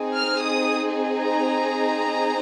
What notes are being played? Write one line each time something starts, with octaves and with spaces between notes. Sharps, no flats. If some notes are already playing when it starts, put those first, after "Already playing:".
Already playing: C4 D#4 G#4
F6
D#6
A#5